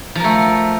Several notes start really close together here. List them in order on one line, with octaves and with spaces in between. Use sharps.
F3 A#4 A3